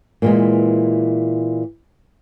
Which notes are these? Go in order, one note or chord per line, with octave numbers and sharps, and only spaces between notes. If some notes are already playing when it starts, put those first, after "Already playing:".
A#2 E3 G#3